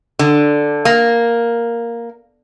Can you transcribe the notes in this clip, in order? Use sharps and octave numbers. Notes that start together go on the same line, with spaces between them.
D3
A#3